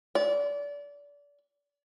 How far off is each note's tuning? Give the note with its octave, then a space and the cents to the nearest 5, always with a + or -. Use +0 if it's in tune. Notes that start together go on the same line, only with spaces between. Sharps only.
D5 -30